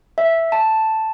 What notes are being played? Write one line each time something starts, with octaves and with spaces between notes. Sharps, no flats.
E5
A5